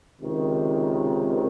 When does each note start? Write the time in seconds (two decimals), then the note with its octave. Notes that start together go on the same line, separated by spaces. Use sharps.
0.21 C#2 C3 D#3